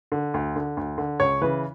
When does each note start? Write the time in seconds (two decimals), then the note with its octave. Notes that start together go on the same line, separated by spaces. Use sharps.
0.12 D3
0.34 D2
0.56 D3
0.77 D2
0.98 D3
1.20 C#2 C#5
1.42 C#3 E3 B4